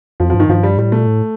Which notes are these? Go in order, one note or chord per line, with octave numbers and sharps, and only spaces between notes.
F2 F3
G2 F3
D#3
G2 F3
G3
A2 G3
A#2 A3
A2